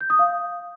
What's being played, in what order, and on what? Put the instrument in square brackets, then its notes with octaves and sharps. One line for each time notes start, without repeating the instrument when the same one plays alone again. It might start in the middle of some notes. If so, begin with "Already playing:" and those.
[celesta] G6
D#6
F5